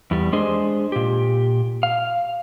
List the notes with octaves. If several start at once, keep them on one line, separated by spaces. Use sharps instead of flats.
E2 G3
G#3 D4 G#4 C5 D#5
A#2 G4
F5